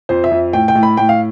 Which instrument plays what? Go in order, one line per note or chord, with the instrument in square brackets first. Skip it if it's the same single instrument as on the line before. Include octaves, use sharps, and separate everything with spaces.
[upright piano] F2 C5
E5
F2
A2 G5
G5
A2
B5
A2 G5
F5